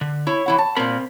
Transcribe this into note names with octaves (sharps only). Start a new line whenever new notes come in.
D3
E4 C#5
E3 E4 F#5
A5
A#2 C4 A#4 B5